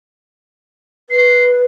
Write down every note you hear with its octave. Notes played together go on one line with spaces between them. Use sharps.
B4 C7